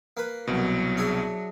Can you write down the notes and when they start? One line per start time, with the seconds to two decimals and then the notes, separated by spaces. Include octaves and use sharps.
0.17 A#3 B4
0.47 C2 B2 F#3
0.97 D4 G#4 E5